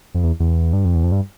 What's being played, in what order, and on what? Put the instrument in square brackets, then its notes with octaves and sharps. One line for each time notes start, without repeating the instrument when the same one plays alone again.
[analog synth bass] F2
E2
E2
G2
F2
E2
F2
G2